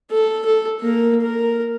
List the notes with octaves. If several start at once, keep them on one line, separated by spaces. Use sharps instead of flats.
A4
A4
A#3 A#4
A#4